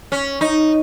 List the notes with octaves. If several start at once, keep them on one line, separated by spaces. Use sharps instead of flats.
C#4
D#4